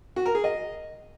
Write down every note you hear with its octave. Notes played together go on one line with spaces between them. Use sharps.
F#4
A#4
G#4
D#5